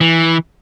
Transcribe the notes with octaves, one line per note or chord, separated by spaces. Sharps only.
E3